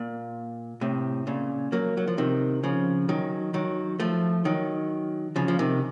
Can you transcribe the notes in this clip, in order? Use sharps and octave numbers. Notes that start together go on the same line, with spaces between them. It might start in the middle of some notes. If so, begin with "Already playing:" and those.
Already playing: A#2
A2 C3
A#2 C#3
F#3 A#3
F#3
F3
C3 D#3
C#3 F3
D#3 F#3
D#3 F#3
F3 A3
D#3 F#3
C#3 F3
F3
C3 D#3